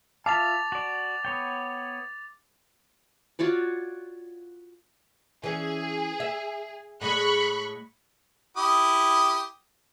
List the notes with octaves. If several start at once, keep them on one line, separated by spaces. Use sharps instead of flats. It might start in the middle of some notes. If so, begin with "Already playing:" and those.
F4 E5 F5 A5 D6 A6 F7
F#4 D5
B3 C#5 G5
F4 F#4 C#5 D5
E3 C#4 G#4
E5
A2 G#3 G#4 B5 C#6 F#6
E4 G4 D#6